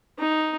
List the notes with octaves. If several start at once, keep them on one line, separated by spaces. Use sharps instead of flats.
D#4